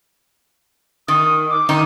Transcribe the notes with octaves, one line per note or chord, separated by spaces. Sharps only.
D#3 D#6
D6
D#3 D#4